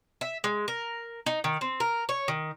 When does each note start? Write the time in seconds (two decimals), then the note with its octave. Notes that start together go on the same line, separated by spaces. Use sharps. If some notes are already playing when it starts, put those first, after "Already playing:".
0.21 E5
0.44 G#3
0.68 A#4
1.26 D#4
1.44 D#3
1.61 C4
1.80 A#4
2.09 C#5
2.28 D#3